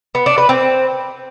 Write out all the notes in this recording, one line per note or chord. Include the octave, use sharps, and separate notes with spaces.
B3
D4
B4
C4